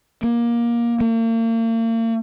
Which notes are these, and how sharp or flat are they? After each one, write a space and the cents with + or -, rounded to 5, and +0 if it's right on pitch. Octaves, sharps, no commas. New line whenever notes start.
A#3 +20
A#3 -40